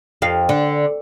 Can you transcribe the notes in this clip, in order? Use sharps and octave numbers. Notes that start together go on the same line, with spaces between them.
F2 F5
D3